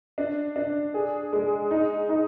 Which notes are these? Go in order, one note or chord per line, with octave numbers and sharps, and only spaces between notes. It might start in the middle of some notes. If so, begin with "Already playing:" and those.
D4
D4
G#4
G#3
D#4
D#4